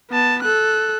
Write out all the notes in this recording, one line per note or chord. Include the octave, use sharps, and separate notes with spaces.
B3 A5
A4 F#6